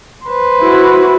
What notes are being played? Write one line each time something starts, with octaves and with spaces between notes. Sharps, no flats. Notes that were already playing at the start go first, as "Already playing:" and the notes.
B4 C5
E4 F#4